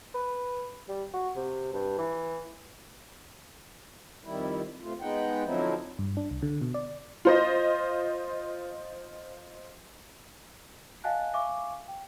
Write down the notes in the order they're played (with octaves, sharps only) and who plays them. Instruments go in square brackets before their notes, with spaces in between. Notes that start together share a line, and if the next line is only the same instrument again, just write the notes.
[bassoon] B4
G3
F#4
C3
G2
E3
[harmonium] F2 D#3 G3 E4
C3 A3 F4
G#3 B3 D#4 F#5 G5
D3 F3 F#3 C4 D#4 E4
[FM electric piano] G2
D4
C2
D3
B2
D5
[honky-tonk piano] F4 C5 D#5
[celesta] D#5 F5 F#5 G#5 A5 F#6
E5 F5 G#5 C#6 D6
G5